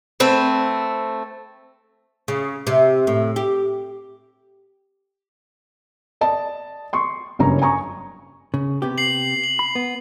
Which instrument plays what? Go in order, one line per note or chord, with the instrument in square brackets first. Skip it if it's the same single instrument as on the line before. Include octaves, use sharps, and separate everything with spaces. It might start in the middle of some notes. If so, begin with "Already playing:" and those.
[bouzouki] A3 C4 B4
[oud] C#3
C3
A2
G4
[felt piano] D5 D#5 A5
C6 C#6
F#1 G2 C#4 C#5 A#5
G#5 A#5 C#6
[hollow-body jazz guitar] C#3
C3 B3 G4
[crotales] C7 F#7
F#7
[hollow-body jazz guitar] B5
B3